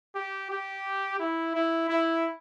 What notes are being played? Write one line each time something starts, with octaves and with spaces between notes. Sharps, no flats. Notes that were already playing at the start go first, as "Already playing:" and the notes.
G4
G4
E4
E4
E4